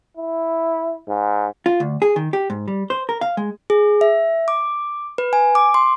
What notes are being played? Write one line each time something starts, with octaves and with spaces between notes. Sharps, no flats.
E4
G#2
F4
D2
G#4
D#3
G4
G#2
G3
C5
A#4
F5
G#3
G#4
E5
D6
B4
G#5
D6
C6